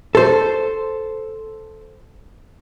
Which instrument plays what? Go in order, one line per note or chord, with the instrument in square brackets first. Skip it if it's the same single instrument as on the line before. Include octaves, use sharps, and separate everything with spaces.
[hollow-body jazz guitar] A4 C5